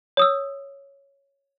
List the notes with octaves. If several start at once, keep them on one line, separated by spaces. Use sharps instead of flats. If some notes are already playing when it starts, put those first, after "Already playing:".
C#5 D#6 E6